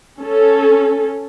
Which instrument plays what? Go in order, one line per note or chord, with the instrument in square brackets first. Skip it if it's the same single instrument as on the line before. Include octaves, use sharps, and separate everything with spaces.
[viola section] C#4 A4